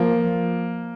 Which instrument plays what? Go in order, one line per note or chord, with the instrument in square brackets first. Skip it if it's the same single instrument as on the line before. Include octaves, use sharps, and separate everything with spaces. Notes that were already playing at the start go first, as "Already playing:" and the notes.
Already playing: [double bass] F3 [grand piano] A#3